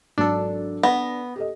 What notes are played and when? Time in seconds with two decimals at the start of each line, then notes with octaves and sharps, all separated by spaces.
0.18 G#1 F#3 D4 A4
0.83 B3 A#6
1.36 G4 A4 D#5